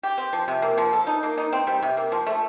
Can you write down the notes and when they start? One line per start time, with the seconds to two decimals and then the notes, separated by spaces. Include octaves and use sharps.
0.03 G4
0.18 C4
0.33 F3
0.48 C3
0.62 A#3
0.78 F3
0.93 A4
1.07 D#4
1.23 A#3
1.38 D#4
1.53 C4
1.67 G3
1.83 C3
1.97 A#3
2.12 F3
2.27 A3